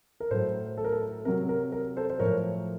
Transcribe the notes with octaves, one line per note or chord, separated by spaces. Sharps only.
A#4
A2 F#3 A4 C5
A4
A#4
A4
C3 F#3 A#4
A#4
A#4
A4 C5
C5
A2 F3 A#4 C#5